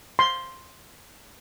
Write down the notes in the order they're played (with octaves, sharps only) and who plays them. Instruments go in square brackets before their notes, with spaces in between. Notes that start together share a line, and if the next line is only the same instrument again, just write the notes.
[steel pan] C6